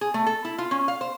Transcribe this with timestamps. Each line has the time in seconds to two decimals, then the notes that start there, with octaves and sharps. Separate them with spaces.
0.01 G#4
0.14 A3
0.26 A4
0.45 E4
0.58 F4
0.71 C#4
0.88 F5
1.01 C5